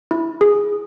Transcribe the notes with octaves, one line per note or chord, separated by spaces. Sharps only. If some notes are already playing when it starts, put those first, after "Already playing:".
E4
G#4